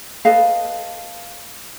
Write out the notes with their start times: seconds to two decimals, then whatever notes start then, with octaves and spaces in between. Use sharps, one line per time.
0.25 A4 B4 D#5 F5